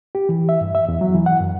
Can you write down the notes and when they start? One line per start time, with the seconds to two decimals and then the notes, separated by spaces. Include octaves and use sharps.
0.15 G4
0.29 E3
0.49 E5
0.61 G2
0.75 E5
0.88 E2
1.01 F#3
1.15 E3
1.26 F#5
1.40 F#2